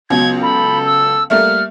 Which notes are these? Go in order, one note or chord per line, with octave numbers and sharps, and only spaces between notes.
C#2 F#3 B3 G#6
A4 B5
E6
G3 A3 A#3 E5 F6